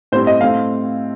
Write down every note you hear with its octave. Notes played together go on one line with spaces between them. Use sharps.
A2 G3 C4 C5
D#5
A2 A3 C4 F5